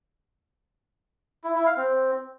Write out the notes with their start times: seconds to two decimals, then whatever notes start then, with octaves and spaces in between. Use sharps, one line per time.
1.44 E4
1.55 E4
1.66 F5
1.77 C4